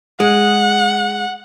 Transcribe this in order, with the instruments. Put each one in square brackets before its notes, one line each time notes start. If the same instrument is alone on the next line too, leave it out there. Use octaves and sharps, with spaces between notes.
[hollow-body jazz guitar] G#3 [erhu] F#5